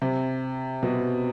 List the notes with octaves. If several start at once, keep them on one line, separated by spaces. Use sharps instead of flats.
C3
B2